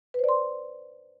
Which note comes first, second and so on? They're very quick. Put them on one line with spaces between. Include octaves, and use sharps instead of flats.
B4 C5 D5 C6